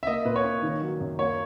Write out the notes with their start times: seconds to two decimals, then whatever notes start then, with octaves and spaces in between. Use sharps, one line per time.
0.03 E5
0.07 A#3 D#5
0.25 A#2 B4
0.36 C#5
0.44 C#4
0.62 D#3
0.81 F#3
1.01 F#2
1.19 A#3 C#5